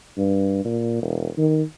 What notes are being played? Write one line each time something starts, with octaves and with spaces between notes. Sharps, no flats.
G2
A#2
E1
D#3